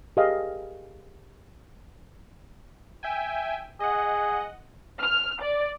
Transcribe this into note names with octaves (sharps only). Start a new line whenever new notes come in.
G4 G#4 A#4 D#5 F5
E5 G5 G#5
G#4 D#5 F#5
F6
D5